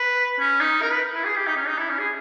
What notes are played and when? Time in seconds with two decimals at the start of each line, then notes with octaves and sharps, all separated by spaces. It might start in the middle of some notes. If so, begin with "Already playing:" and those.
Already playing: B4
0.39 C#4
0.60 D#4
0.82 A#4
0.92 B4
1.14 E4
1.25 G#4
1.35 G4
1.46 D#4
1.57 C#4
1.67 D#4
1.78 E4
1.89 C#4
1.99 G#4